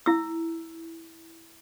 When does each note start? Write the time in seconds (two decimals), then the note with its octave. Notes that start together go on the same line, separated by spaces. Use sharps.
0.06 E4 E6